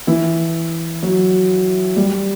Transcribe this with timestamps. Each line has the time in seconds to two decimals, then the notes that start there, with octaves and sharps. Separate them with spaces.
0.07 E3 E4
1.02 F#3 F#4
1.96 G3 G4